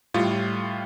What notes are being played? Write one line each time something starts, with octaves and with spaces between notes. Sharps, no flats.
A2 G3 F4